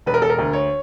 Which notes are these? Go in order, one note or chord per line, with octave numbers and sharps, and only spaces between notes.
E1 B4
A#4
A4
A#4
D2
C#5